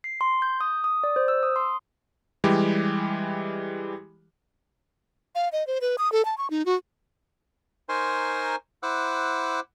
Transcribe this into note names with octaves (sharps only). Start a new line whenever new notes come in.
C7
C6
G6
D#6
D#6
D5
C5
E6
D#6
C6
E3 G3 G#3 G4
F5
D#5
C5
B4
D#6
A4
A5
C#6
D#4
F#4
D#4 A#4 C5 G#5 C6 C#6
E4 C5 F#5 D6 E6 F#6